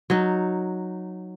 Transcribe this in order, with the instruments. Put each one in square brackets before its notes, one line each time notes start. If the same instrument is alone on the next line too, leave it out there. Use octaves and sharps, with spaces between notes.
[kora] F#3 D#4